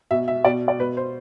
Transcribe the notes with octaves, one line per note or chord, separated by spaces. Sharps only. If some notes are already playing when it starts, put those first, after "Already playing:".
B2 E5
E5
B2 D5
D5
B2 B4
C5